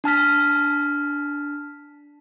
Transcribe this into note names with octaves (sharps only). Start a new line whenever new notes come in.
D4 A5 F6 B6